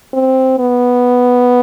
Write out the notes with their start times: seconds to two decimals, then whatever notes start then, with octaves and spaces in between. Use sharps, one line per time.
0.13 C4
0.59 B3